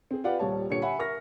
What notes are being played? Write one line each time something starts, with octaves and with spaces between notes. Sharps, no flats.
C4 G#4
F4 G4 B4 D5 F5 F#5
D#1 G3 C#5 A5
A#2 D3 G3 C#5 C#7
E5 F#5 G#5 B5
A#4 E5 C#6 F6 A#6